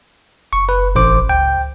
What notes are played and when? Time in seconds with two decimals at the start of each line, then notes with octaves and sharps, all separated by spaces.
0.53 F#1 C#6
0.69 B4
0.95 A1 C5 D6
1.29 C#2 G5